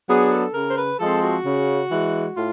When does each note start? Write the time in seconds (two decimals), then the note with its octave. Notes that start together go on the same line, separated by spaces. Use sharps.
0.08 F#3 B3 D4 G#4
0.31 A4
0.54 C#3 A#4
0.68 C5
0.77 B4
0.99 F3 G#3 C4 A4
1.22 F#4
1.45 C#3
1.91 E3 G#3
2.36 A2 F4